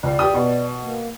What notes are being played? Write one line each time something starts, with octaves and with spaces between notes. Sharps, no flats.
C#2 D5
G4 G5 D#6
B2
A#3